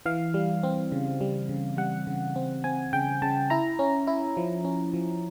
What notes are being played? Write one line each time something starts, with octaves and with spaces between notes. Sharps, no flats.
E3 F5
G3
C4
C#3
G3
C#3
G3 F#5
C#3
C4
C4 G#5
C#3 G5
C#3 A5
E4 A#5
C#4
E4
F3
C#4
F3